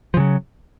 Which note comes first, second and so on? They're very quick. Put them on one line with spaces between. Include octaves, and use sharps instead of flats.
F3 C#3 F#3